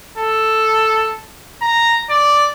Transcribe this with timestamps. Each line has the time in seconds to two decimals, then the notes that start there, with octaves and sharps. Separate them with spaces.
0.18 A4
1.62 A#5
2.10 D5